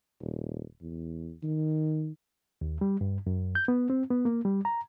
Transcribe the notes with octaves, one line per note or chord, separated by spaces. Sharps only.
D#1
E2
D#3
D#2
G3
G2
F#2
G6
B3
C4
B3
A#3
G3
A#5